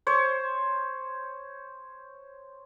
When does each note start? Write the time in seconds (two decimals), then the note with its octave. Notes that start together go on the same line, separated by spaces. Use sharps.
0.07 C5 C#5